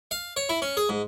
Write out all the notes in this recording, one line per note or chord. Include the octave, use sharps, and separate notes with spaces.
F5
C#5
E4
C#4
G#4
G#2